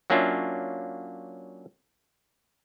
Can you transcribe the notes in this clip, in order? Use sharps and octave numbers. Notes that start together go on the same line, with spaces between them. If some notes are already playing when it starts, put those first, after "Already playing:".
F#3 A#3 C#4 D4 F4 E5